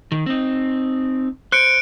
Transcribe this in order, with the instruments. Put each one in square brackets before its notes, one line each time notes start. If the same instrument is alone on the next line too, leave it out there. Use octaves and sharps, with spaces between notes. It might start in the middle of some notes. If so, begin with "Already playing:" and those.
[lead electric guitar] D#3
C4 D#4
[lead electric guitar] C5 [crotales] F#6 C#7 D7